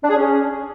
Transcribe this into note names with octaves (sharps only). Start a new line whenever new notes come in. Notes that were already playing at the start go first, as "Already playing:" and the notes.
D4
G#4
C#4